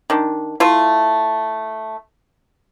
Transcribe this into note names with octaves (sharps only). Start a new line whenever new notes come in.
D#3 D4
A3 E4 F4